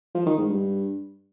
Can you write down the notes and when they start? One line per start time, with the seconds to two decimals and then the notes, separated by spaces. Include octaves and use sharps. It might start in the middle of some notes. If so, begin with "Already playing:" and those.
0.15 F3
0.26 D#3
0.38 G#2
0.49 G2